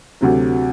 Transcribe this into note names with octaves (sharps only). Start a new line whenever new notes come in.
D2 C3 F#3